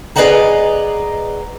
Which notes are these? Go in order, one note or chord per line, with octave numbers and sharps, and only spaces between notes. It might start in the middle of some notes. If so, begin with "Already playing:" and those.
G#4 B4 D5 D#5 F#5 A#5